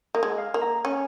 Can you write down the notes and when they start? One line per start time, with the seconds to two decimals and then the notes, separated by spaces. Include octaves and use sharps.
0.15 A#3 D#5
0.23 G#3
0.38 F5
0.54 A#3
0.62 A#5
0.85 C#4 G#5